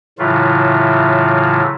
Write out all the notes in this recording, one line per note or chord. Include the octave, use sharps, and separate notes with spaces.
A2 C#3 E3 F#3 E4 F4